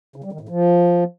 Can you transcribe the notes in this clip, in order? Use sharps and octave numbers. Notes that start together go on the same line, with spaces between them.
C#3
G3
D#3
A2
F3